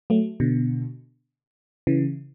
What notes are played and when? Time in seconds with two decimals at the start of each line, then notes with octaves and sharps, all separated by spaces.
0.10 F#3 A3
0.40 B2 D3
1.87 C#3 E3